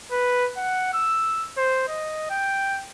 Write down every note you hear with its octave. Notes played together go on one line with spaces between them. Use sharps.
B4
F#5
E6
C5
D#5
G5